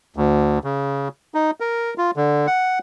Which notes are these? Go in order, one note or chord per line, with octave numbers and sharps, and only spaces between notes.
D2
C#3
D#4
A#4
F4
D3
F#5